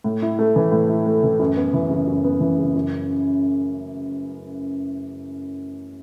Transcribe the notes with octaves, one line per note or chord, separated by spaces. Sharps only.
A2
E4
A3
E3
A2
E4
A3
E3
F#2
B3
E3
C#3
F#2
B3
E3
C#3
F#2